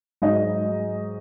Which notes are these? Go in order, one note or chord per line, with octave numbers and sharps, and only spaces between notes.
G#2 F#3 G#3 D#4 G#4 D#5